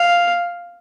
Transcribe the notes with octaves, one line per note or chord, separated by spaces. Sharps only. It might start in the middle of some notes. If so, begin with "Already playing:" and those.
Already playing: F5